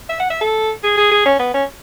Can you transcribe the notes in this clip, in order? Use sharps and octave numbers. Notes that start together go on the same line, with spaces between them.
E5
F#5
E5
A4
G#4
G#4
G#4
C#4
B3
C#4